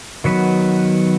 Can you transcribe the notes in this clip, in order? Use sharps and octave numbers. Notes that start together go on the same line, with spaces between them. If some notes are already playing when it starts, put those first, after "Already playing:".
D#3 F#3 B3 F#4 B4